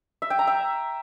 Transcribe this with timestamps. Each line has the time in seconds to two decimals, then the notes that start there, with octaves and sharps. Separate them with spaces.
0.22 E5
0.30 G5
0.39 A#5
0.47 E5